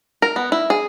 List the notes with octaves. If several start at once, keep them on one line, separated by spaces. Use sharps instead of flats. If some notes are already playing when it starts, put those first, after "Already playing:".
A#4
B3
E4
G#4